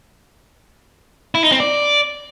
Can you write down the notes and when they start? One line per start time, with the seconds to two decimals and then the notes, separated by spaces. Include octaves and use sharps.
1.35 E4
1.43 D#4
1.52 C4
1.60 D5